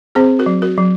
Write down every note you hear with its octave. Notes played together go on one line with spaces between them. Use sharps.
C4 G#4 C5
F#4 A#4
F#3
F#4 A#4
F#3